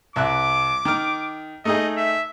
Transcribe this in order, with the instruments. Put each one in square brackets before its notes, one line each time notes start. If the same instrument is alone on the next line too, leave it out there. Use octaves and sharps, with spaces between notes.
[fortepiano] C2 E5 F#6 [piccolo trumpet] D6
[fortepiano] D#3 F6
[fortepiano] A3 D#4 G#4 [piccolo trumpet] D#5
[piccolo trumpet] E5